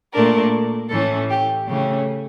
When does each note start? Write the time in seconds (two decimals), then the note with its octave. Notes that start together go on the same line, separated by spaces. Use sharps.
0.13 A#2 A3 D4 A#4
0.90 A2 E3 A3 C#4 A4
1.29 G4
1.67 C#3 E3 A3 C#4 G4